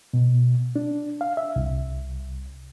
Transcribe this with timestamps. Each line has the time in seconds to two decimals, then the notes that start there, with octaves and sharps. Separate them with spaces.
0.13 B2
0.76 D4
1.21 F5
1.37 E5
1.56 C2